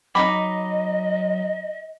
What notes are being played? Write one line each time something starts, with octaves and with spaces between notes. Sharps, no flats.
F#3 D#4 G#4 D#5 B5 D6